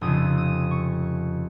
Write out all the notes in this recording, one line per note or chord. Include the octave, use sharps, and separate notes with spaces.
F1 F2 C#3 F3 D#6
D#6
C#6